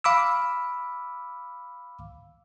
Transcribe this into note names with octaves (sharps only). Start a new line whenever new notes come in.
F5 B5 D6 E6